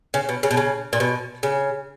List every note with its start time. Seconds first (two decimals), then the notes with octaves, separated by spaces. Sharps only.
0.14 C#3
0.29 B2
0.43 C#3
0.51 B2
0.57 C#3
0.93 A#2
1.00 B2
1.43 C#3